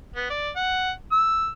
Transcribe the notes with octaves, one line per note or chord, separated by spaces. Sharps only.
B3
D5
F#5
E6